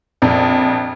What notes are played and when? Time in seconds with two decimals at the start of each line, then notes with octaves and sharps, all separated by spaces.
0.22 A#1 F2